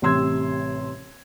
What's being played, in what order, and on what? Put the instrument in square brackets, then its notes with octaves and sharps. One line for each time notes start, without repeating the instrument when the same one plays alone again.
[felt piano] A1 C3 G3 C6 E6 G#6